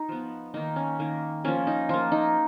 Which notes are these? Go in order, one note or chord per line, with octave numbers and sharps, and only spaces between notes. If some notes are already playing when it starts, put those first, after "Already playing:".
Already playing: D#4
F3 B3
D#3 A#3 D#4
C#4
D#3 A#3
F3 A#3 C#4
D#4
F3 A#3 F4
D#4